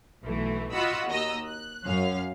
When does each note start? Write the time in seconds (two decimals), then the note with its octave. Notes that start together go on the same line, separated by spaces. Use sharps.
0.24 B1 E3 A3
0.72 F4 F#4 D#5 F#5 B5 E6
1.08 D#2 D#5 A#5 E6
1.46 F#6
1.85 F#2 C#4 F5